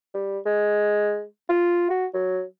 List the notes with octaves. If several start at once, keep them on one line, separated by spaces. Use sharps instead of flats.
G3
G#3
F4
F#4
F#3